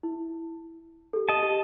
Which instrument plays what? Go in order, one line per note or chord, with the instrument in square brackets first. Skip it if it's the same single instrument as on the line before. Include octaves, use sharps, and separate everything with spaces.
[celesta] E4
G4 A4
[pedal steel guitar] D#5 A5
[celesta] G4